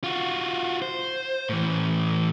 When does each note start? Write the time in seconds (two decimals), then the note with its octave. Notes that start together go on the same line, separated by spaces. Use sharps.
0.04 F4 F#4
0.82 C5
1.49 A2 E3